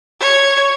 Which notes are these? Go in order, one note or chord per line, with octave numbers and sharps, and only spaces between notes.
C#5